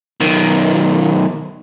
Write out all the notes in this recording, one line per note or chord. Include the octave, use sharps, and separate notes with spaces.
B1 D#3